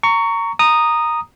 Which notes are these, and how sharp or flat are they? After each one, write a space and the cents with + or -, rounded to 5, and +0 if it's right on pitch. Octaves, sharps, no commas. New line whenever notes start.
A#5 -20 C#6 +15
A#5 +0 D#6 -10